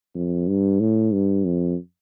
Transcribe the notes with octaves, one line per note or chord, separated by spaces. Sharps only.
F2
G2
A2
G2
F2